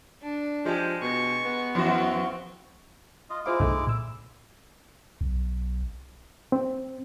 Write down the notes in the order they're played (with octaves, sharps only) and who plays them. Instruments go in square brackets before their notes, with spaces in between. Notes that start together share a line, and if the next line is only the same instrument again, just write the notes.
[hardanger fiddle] D4
[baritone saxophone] F3 [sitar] G#3 G4
[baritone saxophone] B2 [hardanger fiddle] C#6
[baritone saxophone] B3
[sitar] F2 E3 F#4 [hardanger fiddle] C4
[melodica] F4 D#5
[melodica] G#3 E4 D6 [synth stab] F4 C5 F5
[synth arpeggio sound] C2 D#3 [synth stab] G2 A3
[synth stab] A#2 E6 [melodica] F4
[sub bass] B1
[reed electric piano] C4